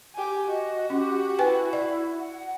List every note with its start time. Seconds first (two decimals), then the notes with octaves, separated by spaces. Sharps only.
0.15 G4 G#5
0.48 F#4 D#5
0.90 C#4 G4
1.39 E4 B4 G5 G#5
1.73 D5
2.19 F#5